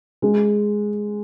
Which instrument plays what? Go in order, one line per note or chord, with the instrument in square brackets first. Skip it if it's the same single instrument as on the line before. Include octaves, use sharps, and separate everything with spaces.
[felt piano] G#3